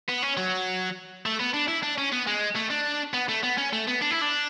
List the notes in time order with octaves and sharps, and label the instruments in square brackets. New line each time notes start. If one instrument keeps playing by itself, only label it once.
[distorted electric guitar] B3
C#4
F#3
A3
B3
D4
E4
D4
C#4
B3
G#3
A3
D4
B3
A3
B3
C#4
A3
B3
D4
E4
D4